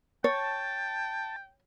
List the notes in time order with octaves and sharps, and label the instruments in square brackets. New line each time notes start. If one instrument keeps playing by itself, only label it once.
[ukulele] C#5 [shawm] G5 [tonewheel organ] A5